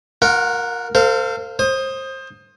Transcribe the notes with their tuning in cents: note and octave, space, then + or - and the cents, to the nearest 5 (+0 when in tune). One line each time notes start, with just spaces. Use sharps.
F4 +45 A#4 +0 F#5 +0
A4 +45 C5 -15 F5 +0
C5 +25 D#6 +0